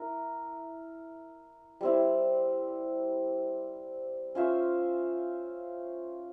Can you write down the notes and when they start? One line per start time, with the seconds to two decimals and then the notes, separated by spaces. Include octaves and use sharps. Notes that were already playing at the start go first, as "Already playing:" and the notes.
Already playing: E4 A#4
1.81 G3 C4 E4
4.35 C#4 F4 C5 E5